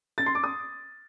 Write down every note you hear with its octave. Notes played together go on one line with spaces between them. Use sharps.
A6
C6
D6
D#6